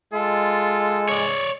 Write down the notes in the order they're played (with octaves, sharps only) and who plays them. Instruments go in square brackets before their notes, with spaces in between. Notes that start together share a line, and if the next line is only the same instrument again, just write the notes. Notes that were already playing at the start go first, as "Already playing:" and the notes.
[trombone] G#3 [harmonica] F4 A4
[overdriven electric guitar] C#5 D5